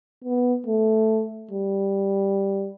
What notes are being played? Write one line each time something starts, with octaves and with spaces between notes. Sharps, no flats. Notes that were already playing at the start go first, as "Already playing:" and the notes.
B3
A3
G3